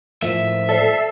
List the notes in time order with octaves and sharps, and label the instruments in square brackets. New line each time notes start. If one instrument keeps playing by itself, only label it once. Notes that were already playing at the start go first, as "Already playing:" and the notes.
[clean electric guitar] A2 F3 A#3 [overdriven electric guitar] E5
[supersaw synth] A4 C7 [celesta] C5 D5 A5